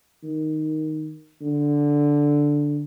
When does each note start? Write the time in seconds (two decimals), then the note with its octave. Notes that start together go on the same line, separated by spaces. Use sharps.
0.23 D#3
1.42 D3